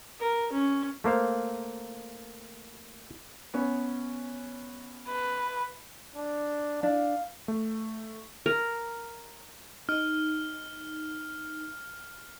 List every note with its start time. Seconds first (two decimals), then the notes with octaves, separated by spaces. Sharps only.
0.20 A#4
0.52 C#4
1.04 A3 A#3 C5 F5
3.54 B3 C#4
5.08 B4
6.16 D4
6.83 D4 F5
7.48 A3
8.46 A#4
9.89 D#4 F6